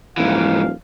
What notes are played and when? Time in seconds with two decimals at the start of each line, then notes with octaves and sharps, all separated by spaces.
0.17 D#1 G#2 E3 F3 F5